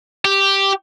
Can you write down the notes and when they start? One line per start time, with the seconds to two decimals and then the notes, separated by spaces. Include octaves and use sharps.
0.25 G4